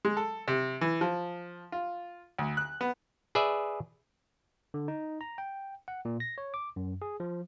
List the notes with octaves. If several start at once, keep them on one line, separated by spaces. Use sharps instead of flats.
G#3
A4
C3
E3
F3
F4
D2
F#6
B3
G#4 B4 D5 E5
D3
D#4
A#5
G5
F#5
A#2
A#6
C#5
D6
F#2
G#4
F3